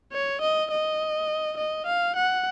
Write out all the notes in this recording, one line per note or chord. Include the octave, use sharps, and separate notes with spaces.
C#5
D#5
D#5
D#5
F5
F#5